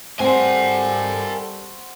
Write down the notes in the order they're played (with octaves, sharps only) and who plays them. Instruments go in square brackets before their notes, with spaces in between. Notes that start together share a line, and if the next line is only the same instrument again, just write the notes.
[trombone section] G3 A4 [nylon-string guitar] C4 [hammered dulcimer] F#4 C5 [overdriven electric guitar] A#4 G#5